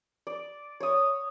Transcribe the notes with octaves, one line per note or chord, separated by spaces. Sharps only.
D5
C#5 D#6